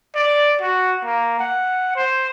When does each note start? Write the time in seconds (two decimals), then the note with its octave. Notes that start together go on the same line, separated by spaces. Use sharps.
0.15 D5
0.61 F#4
1.04 A#3
1.39 F#5
1.96 C5